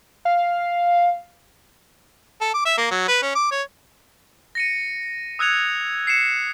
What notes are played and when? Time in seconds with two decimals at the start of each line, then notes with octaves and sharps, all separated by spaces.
0.25 F5
2.41 A4
2.54 D6
2.65 E5
2.78 A#3
2.91 F#3
3.08 B4
3.22 C#4
3.35 D6
3.51 C#5
4.55 A#6 C#7 D#7
5.39 D#6 E6 F#6 G#6 C#7 F7
6.07 C7 C#7 E7